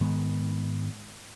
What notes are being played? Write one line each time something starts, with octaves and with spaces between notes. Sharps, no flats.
G#2 D#3 G#3 B3